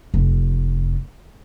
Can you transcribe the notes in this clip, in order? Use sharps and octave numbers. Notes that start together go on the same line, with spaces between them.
F1